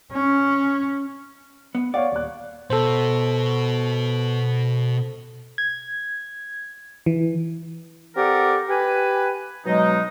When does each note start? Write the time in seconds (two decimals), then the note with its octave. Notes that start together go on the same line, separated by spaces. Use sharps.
0.12 C#4
1.75 B3
1.94 C#5 D5 F5 F#5
2.12 D#1 F#6
2.70 B2 A4 C5
5.58 G#6
7.06 E3
8.16 C4 G4 A4 A#4 D5 F#5
8.69 G4 B4 G#5
9.66 B2 F#3 G#3 D#4